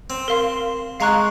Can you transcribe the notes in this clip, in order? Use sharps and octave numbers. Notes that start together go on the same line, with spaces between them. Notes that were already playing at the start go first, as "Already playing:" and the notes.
C4
A#4 F5 C6
G#3 F5 A#5 C#6 F#6